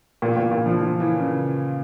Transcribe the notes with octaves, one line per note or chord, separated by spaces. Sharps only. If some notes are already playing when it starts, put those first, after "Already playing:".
A#2
A#2
A#2
F3
F3
E3
C#3